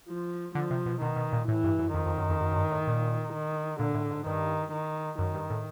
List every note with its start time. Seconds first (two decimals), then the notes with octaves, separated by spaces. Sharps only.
0.09 F3
0.55 D3 F3
0.70 C3
0.86 B2
1.01 B2 D#3
1.16 B2
1.33 A#2
1.48 A2 E3
1.64 G2
1.79 F#2
1.94 F2 D#3
2.06 F2
2.18 F#2
2.29 F2
2.40 F#2
2.51 F#2
2.56 G2
2.71 A2
2.87 A#2
3.33 D#3
3.79 A#2 D3
3.94 A2
4.11 G#2
4.26 G2 D#3
4.72 D#3
5.19 F#2 D#3
5.34 G2
5.50 A2